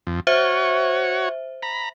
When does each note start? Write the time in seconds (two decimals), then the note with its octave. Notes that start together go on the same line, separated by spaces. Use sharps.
0.07 F2
0.27 F#4 C5 C#5 E5
1.63 A#5 B5